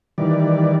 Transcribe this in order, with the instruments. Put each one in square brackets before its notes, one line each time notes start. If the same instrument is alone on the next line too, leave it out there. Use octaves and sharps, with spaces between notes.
[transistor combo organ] D#3 E3 G3 D5